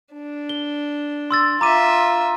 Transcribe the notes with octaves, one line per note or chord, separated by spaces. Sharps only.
D4
G7
C6 E6 A6
F4 E5 A#5 D6 D#7